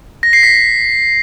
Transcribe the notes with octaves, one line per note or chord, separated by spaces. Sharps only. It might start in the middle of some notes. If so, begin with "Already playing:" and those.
A#6
C7
B6